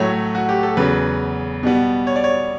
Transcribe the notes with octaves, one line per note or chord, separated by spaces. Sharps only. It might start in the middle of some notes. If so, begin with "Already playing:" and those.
Already playing: A2 F#3 A3 C#5
F#4
G4
A4
E2 C#3 F#3 B4
B2 G3 B3
C#5
D5
C#5